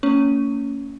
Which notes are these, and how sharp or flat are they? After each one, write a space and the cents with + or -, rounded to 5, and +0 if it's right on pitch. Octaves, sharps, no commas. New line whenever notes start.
A#3 -35 C#4 +15